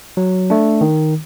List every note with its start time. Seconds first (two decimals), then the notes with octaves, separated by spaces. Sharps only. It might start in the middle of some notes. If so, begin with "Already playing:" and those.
0.17 F#3
0.50 A3 D4
0.81 D#3